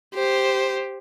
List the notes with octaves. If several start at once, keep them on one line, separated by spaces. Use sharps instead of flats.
G4 C5